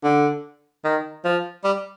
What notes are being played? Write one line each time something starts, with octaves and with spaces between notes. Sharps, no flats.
D3
D#3
F3
G3